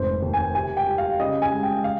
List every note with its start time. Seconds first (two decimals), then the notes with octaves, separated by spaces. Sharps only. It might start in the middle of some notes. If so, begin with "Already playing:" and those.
Already playing: F1 G#2 C5
0.22 D#2
0.34 G#5
0.55 C3 G#5
0.77 G5
0.87 G3
0.98 F5
1.20 C#3 D#5
1.42 G#5
1.52 G#3
1.63 G5
1.84 F5